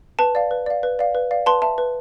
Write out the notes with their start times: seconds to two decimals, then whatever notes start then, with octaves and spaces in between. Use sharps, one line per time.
0.19 B4 A5
0.35 D5 F5
0.51 B4
0.66 D5 F5
0.83 B4
0.99 D5 F5
1.15 B4
1.31 D5 F5
1.46 B4 A5 C6
1.62 E5 A5
1.78 B4